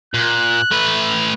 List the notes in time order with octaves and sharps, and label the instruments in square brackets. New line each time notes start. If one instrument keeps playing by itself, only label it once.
[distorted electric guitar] A#2 [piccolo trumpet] F#6
[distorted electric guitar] A3 B4